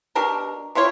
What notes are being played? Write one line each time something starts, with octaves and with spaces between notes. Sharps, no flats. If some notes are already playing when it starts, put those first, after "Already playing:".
B2 D4 G4 A#4
C3 E4 F4 C#5